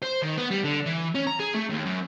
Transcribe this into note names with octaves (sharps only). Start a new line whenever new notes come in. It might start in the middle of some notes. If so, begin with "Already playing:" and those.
C5
D#3
B3
G3
D3
E3
C#4
A#5
G#4
A3
D#2
F#2